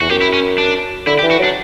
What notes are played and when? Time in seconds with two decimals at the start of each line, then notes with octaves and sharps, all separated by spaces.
0.01 E2 F#4
0.10 F#2 G4
0.21 E4
0.34 C#4
0.58 D4
1.06 D3 E4
1.19 G4
1.23 E3
1.31 F#4
1.39 F#3 D4